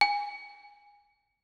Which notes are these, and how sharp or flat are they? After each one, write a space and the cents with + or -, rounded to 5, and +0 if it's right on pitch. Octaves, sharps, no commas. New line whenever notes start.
G#5 -15